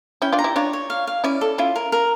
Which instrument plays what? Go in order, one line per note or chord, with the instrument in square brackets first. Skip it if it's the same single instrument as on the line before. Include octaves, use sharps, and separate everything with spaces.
[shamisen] C#4 E4 [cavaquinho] G5
[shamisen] D4 F4
[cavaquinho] A#5
[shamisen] E4 G4
[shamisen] D4 F4 [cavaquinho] C#5
[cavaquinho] C#5
F5
F5
[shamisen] C#4 E4 [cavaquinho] D5
[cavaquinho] A4
[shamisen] C#4 E4 [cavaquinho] F4
[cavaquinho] A#4
A#4